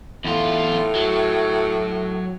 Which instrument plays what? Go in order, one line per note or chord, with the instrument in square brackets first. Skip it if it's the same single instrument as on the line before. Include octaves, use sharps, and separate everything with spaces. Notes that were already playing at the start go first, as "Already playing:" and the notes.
[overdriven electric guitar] E2 F4 [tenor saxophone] A2
[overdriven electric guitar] F#3